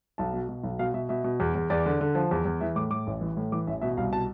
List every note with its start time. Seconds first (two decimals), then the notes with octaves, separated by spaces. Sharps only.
0.18 B1 A5
0.33 B2
0.49 B2
0.64 B1
0.79 B2 F5
0.94 B2 E5
1.09 B2 E5
1.24 B2
1.40 E2
1.55 E2
1.70 E2 D5
1.86 D3
2.01 D3
2.15 F3
2.31 E2
2.45 E2
2.61 E3 E5
2.76 A2 D6
2.91 A2 D6
3.07 A1
3.21 E3
3.37 A2
3.52 E3 D6
3.67 A1 E5
3.81 B2 E5
3.97 C2 F5
4.12 B2 A5